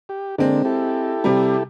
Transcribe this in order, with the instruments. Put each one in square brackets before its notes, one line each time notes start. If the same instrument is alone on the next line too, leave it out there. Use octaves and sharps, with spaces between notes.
[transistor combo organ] G4
[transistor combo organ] D3 A#3 D4 [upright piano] G#3 C4
[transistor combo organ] E4 G4 A4
[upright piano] C3 G3